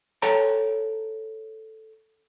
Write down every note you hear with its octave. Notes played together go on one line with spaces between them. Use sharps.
A4 C#5 G5 A#5